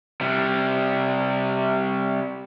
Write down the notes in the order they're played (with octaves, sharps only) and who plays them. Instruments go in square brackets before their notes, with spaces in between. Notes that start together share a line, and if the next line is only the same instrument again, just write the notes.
[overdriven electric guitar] C3 G3